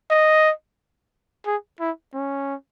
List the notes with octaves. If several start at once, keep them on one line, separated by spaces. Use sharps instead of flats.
D#5
G#4
E4
C#4